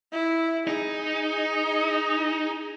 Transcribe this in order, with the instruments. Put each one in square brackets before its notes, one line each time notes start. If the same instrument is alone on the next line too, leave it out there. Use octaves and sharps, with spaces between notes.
[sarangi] E4
[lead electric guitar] D#4 [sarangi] G#4